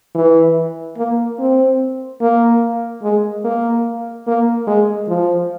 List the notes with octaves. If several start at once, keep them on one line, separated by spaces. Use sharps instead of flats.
E3
A#3
C4
A#3
G#3
A#3
A#3
G#3
F3